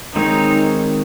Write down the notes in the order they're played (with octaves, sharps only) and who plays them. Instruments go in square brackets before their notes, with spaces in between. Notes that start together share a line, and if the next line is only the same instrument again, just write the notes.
[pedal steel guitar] D#3 G#3 C4 F#4 C#5 [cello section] D#4